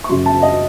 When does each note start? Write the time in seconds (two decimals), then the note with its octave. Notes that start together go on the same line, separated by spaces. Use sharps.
0.04 C#6
0.09 F#2 C#3 F#3 C6
0.26 A5
0.42 D#5